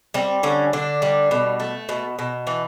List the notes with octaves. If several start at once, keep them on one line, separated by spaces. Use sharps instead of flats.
G3 C4
D3 C#4
D3 D4
G3
B2
A3
B2
B2
E3